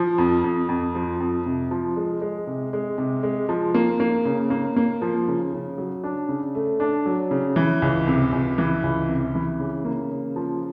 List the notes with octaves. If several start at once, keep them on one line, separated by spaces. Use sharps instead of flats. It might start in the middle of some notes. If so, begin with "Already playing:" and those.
Already playing: F3
F2
F2
F2
F3
F2
C3
F3
G#3
G#3
C3
G#3
C3
G#3
F3
A#3
A#3
C#3
A#3
A#3
F3
C#3
C#3
F#3
D4
C#3
A3
D4
F#3
C#3
E3
C#2
C3
C#2
E3
C#2
C3
E3
C#3
A#3
C#3
F3